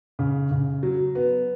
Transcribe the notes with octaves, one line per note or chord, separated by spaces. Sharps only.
C#3
C#3
F#3
B3